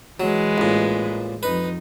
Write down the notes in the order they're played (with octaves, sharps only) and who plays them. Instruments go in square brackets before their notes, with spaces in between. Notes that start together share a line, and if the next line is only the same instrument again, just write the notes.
[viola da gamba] E3 G#3 B4 [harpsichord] F#3
[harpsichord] A1 A#2
[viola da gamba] F2 D#4 [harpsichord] B4